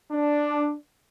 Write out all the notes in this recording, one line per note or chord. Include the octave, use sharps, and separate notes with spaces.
D4